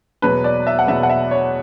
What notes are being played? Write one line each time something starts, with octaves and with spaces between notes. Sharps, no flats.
E2 B2 F#3 B4
D5
E5
F#5
E2 B2 F#3 E5
F#5
E5
C#5